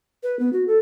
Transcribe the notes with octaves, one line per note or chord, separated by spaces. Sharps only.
B4
B3
F#4
A4